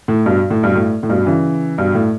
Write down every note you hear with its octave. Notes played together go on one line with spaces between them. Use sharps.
A2
G2 B2
A2
G2 B2
A2
A2
G2 B2
C#3 E3
G2 B2
A2